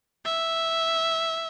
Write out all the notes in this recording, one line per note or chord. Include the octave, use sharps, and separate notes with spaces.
E5